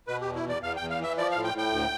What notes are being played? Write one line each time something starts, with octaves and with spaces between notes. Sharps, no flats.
B2 B4
E2 G4
E4
E2 D5
E2 F5
E2 G5
F5
E3 E5
F3 D5
F5
A2
G5
A2 G5
D2